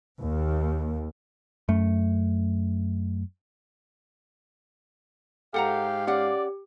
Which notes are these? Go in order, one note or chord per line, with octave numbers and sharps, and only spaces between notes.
D#2
F#2 A3
G#2 G4 A4 F5 F#5 A#5
C#4 G4 D5 F#5